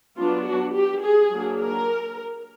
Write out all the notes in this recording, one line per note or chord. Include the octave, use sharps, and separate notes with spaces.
F#3 B3 D4 F4
F#4
G4
G#4
F#3 A#3 D4
A#4